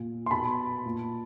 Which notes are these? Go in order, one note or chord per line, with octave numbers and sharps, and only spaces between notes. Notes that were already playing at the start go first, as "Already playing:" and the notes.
Already playing: A#2
C6
B2 A5 B5
A#2